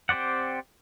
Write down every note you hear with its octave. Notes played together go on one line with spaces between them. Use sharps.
C4 G4 C5 D5 F#5